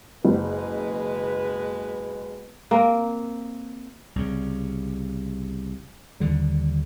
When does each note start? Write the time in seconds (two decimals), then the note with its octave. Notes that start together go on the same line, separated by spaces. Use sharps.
0.25 F#1 B2 G#3 B4
2.71 A#3 C4
4.16 C2 C#3
6.20 D#2 D3 G3